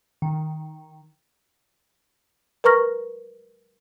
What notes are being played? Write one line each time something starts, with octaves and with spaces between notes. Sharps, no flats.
D#3
A#4 B4 A#5 C#6 F6 A#6